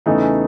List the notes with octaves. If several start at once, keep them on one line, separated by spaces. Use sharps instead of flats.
E2 C#3 E3 A3 D#4